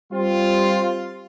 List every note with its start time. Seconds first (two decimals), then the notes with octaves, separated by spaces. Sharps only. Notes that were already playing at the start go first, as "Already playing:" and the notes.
0.12 G3 C4 F4